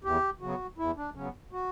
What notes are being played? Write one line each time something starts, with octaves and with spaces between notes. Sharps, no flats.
E2 G4
C#3 F#3 B3 F#4
E2 E4
D4
C#3 F#3 B3 C#4
F#4